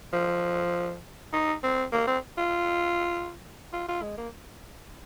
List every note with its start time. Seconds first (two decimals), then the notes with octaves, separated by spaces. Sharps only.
0.13 F3
1.33 D#4
1.63 C4
1.92 A#3
2.07 C4
2.38 F4
3.73 F4
3.88 F4
4.02 G#3
4.18 A#3